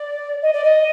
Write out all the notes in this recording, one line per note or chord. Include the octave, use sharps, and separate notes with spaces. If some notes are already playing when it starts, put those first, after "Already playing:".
Already playing: D5
D#5
D5
D#5